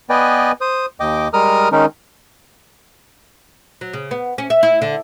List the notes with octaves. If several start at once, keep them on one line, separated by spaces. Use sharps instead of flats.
B3 B4 D5 D#5 G5 G#5
C5 D#6
D#2 D#5 G5 D6
G3 G#3 A#4 A#5 D#6 F6
D#3 G#3 C#4 D#4 A#4
F#3
C#3
B3
C#4
E5
E4
D3